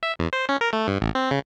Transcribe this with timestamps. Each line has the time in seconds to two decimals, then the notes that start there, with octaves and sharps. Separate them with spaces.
0.03 E5
0.19 E2
0.33 C5
0.49 C#4
0.61 A#4
0.73 A3
0.88 G2
1.01 A1
1.15 C4
1.31 C#3